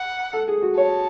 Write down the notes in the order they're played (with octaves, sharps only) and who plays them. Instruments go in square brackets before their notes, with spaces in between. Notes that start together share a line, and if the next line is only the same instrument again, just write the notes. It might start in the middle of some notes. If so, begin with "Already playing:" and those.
Already playing: [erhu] F#5
[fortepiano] A4
G#4
F#4
[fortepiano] C#5 [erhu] A5